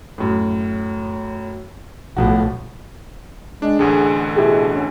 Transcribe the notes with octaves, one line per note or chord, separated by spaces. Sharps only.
F#2 A2
B1 A2 F3 F#4
G#3 D4
A1 D2 D3 G#4
B2 E4 G4 G#4
C#4